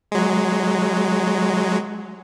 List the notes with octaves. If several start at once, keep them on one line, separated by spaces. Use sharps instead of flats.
F#3 G#3